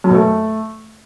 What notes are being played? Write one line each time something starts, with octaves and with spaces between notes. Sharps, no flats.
F#2
B2
A3